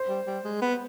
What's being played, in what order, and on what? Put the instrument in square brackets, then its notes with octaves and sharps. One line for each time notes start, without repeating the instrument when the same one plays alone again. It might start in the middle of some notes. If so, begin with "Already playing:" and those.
Already playing: [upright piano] C5
[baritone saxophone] G3
G3
G#3
B3